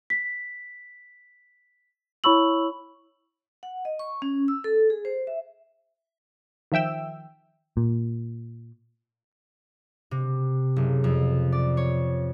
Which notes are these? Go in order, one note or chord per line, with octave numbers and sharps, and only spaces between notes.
B6
E4 C#5 B5 C#6 E6 F#7
F#5
D#5
C#6
C#4
E6
A4
G#4
C5
E5
D#3 F3 E5 G5 E6
A#2
C3
F#1
F2
D5
C#5